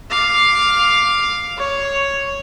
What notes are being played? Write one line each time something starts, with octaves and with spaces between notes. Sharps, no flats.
F5 D6
C#5